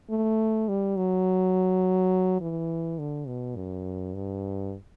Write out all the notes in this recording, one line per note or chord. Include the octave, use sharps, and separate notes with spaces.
A3
G3
F#3
E3
D3
B2
F#2
G2